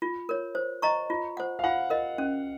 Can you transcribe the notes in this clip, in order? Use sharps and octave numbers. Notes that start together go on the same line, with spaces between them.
F4
A#4 C#5
C5
D#5 A#5 C#6
F4
C5 F#5
F5
F4 F#5
A#4 D#5
C#4